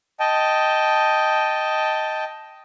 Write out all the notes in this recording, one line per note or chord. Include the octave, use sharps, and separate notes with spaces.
D#5 G5 A5